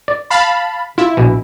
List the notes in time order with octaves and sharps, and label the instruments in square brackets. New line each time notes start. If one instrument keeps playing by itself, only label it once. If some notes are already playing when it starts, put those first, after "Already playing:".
[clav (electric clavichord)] D5
[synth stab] F5 A5 B5
[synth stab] E4 [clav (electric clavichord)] F4
[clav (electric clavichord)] A#1 B2